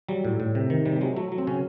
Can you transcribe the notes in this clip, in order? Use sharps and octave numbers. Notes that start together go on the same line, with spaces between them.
F#3 G3
A2
A2
C3
D#3
C3 G3
G3
F#3 G#3
F#3 A3
F#3
C4
C#3 C#4